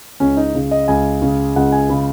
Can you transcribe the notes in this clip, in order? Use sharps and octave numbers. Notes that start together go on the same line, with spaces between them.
C#2 C#4
D#4
C#3
D#5
C#2 G#5
C#3
C#2 F#5
G#5
C#3 B5